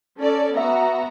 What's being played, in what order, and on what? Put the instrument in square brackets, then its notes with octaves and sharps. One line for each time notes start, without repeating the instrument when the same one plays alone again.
[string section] C#4 A4 D5
[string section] B3 F#4 A#5 [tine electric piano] E5